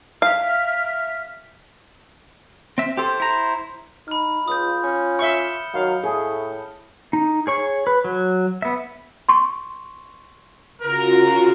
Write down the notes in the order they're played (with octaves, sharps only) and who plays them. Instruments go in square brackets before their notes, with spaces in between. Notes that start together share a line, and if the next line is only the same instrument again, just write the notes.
[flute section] E5 F6 [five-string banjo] F5
[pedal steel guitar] C4 E5
[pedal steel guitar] G4 A4 [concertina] C5
[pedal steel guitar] E4 A#5
[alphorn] D#4 [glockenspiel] B5 F6
[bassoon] C#2 [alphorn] F4 [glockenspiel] D#6 G6
[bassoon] C#4
[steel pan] E5 C#6 [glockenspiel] F6 C#7 G7
[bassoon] D#3 [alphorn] F#3 [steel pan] F5
[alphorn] A2 [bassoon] A3 [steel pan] G#4
[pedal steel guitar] D#4
G#4 C#5 C#6
B4
F#3
B3 E5
[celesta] C6 C#6
[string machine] C#3 F4 F#4 [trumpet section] A#4